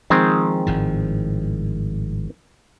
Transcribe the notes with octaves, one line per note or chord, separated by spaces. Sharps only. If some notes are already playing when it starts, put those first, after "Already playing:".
D#3 F3 G#3 C4
G#1 A2 F3